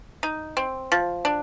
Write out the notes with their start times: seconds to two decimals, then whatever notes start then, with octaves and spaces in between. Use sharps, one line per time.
0.23 D#4
0.57 C4
0.92 F3
1.25 D4